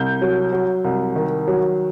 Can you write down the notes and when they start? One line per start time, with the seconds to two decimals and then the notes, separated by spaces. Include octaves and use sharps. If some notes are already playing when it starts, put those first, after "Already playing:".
Already playing: C2 G6
0.22 F#3
0.52 F#3
0.84 C2
1.16 D#3
1.48 F#3